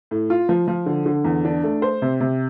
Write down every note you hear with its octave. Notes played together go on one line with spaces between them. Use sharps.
A2
F4
F3
F3
D3
D3
E2
D4
A3
C5
C3
C3